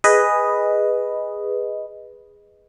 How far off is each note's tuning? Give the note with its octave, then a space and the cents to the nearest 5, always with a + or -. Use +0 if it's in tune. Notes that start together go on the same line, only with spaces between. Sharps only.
G#4 -10 B4 +0 D#5 +0